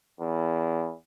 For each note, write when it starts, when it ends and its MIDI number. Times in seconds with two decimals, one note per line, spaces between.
0.20 0.93 40